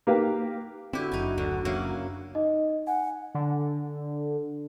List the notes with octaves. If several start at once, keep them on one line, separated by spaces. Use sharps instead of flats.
A#3 G4 B4 F5
D3 C4 E4 F#4 G4
F#1 F#2 D#4 G#5
D2 D3
C#3 F#3 A#3 E4
D#4 D#5
F#5 G#5
D3